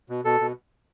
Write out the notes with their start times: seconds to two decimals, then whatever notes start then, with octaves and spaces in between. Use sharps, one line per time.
0.09 B2
0.25 B2 A4
0.41 B2